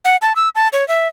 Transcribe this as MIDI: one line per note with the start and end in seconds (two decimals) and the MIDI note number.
0.05 0.16 78
0.22 0.33 81
0.36 0.49 88
0.55 0.68 81
0.73 0.87 73
0.88 1.08 76